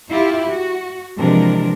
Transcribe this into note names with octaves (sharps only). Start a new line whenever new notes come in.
E4 F4 G4
F#4
C3 E3 F3 G#3 D4 A#4